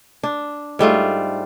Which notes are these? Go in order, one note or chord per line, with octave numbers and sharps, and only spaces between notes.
D4
G#2 G3 A3 F4